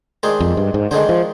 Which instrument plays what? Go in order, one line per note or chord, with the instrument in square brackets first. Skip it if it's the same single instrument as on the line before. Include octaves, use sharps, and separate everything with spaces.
[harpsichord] D#3 G#3 D4 G#4 C5
[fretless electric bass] F2
G2
G#2
[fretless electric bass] D3 [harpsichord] D#3 G#3 D4 G#4 C5
[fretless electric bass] F3